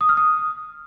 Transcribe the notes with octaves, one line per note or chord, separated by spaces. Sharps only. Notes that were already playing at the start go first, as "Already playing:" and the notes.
D#6
F6
D#6